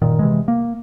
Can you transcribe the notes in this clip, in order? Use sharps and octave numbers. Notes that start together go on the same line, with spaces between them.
F#1 A#2 D#3
C3 E3 G#3
A#3